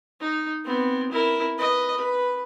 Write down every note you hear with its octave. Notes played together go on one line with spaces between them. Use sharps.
D#4
B3 C4
E4 A#4
B4 D#5
B4